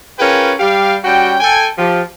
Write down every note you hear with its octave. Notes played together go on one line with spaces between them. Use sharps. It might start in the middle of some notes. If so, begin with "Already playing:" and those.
C#4 F4 G#4 A#4 B4 G5
G3 G4 F5
G3 C#4 F#4 G5
A4 G5 G#5
F3 G4